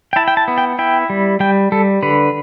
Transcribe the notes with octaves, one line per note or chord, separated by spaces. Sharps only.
G5
E4 A5
G5
A5
B3
G5
E4 G5
G3
G3 G5
G3 A4
D3 B4